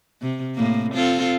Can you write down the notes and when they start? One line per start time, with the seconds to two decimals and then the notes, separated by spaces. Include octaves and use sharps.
0.22 C3
0.55 A2 A#3
0.93 C4 F4 A4